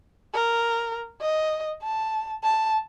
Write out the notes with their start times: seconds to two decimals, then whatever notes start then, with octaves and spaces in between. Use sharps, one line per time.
0.34 A#4
1.21 D#5
1.83 A5
2.43 A5